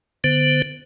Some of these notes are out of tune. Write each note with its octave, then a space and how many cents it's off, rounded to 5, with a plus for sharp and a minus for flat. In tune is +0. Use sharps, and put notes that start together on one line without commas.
D3 +5 B3 +0 C5 -20